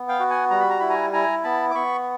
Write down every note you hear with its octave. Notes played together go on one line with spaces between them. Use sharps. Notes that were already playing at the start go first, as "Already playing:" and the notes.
Already playing: B3
F5 G5
F#4
F#5 G#5
G3 A#5
B5
A#5
E4 B5
G#5 A#5
E4 G#5 A#5
B3 A5 B5
D6
B3 B5 C#6